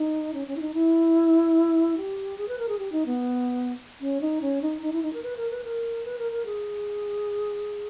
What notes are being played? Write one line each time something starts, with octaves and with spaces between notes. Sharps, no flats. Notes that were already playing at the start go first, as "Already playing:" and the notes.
Already playing: D#4
C#4
C#4
E4
D#4
E4
G4
G#4
B4
A#4
G#4
G4
D#4
B3
C#4
D#4
C#4
D#4
D#4
E4
D#4
A#4
B4
A#4
B4
A#4
B4
A#4
A#4
G#4